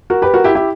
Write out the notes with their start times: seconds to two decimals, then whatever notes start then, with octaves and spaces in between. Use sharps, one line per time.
0.10 F#4 A#4
0.22 G4 B4
0.34 F#4 A#4
0.44 E4 G4
0.55 E4 G4